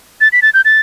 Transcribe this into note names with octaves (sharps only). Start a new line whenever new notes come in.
A6
B6
A6
G6
A6